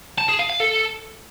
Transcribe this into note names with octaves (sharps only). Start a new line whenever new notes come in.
A5
G#4
F5
F5
A4